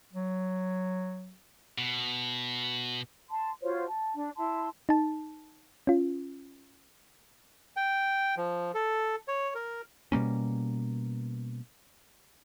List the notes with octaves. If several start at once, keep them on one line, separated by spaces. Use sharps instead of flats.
F#3
B2
A5 C6
F4 F#4 C5 C#5
A5
D4
E4 A5 C6
D#4 A5
C#4 F4
G5
F3
A4
C#5
A#4
B2 G3 A#3 C#4